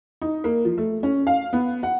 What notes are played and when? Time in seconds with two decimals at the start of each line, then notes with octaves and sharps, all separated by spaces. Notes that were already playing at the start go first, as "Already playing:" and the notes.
0.22 D#4
0.44 A#3
0.65 F3
0.78 A3
1.03 C#4
1.27 F5
1.53 B3
1.83 F#5